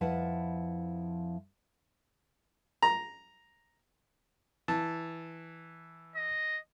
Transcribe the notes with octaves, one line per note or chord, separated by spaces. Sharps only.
F2 F3 E4 B4 F#5
A#5
E3 A5
D#5